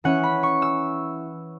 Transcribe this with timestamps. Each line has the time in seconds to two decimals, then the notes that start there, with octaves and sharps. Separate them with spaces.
0.04 E3 C#4 E4 F#5
0.23 B5
0.43 C#6
0.62 E6